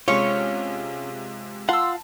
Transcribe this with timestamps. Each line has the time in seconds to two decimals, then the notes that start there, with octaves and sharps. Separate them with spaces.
0.08 C3 G#3 C#4 F4 C#5
1.69 F4 F5 F#5 A5 C6 E6